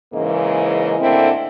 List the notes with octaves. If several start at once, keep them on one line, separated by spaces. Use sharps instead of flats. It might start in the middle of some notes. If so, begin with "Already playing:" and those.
G#2 C#3 E3 A#3 D#5
A2 D3 A#3 C4 E4